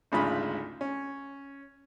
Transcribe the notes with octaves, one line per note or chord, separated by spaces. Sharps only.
G#1 D2 G#2 C#3 F4 B5
C#4